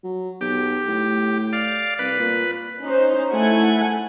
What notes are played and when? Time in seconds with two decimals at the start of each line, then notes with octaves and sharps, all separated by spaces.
0.04 F#3
0.41 B1 G4
0.88 A2
1.53 D5 F5
1.99 C2 B4
2.19 A#2
2.81 C#4 D#4 C5
3.33 A3 E4 F#5 G#5